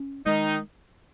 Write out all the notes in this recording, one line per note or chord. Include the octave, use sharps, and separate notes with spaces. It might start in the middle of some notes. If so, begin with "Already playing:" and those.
Already playing: C#4
D#3 G#3 D#4